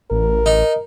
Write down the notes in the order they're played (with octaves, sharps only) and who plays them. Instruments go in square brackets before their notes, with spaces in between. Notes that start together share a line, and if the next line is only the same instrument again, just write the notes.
[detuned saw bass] A1 [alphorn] A#4
[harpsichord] D#4